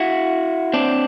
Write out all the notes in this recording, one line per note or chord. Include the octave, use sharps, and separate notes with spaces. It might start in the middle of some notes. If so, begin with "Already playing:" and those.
Already playing: E4 F#4
C4 D4